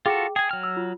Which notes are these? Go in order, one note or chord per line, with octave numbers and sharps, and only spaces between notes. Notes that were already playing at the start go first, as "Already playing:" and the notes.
F4 F#4 G#4 A4 G5 D6
G#4 G5 G#5
F#3 F6
E6
F4